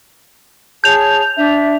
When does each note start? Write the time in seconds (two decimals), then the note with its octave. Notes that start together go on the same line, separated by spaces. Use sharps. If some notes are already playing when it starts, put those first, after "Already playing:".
0.84 G#4 C#5 A5 G6 F7
1.37 D4 E5